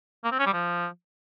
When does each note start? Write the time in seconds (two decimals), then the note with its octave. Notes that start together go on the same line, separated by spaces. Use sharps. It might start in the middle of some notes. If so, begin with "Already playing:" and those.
0.24 A#3
0.32 C4
0.39 C#4
0.46 G3
0.53 F3